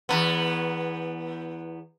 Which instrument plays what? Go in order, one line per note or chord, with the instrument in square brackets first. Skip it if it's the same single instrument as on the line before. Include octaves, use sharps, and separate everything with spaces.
[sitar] E2 G#2 B3